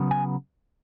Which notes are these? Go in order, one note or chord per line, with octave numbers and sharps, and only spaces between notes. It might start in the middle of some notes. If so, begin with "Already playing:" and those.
Already playing: C#3 F#3 B3
G#5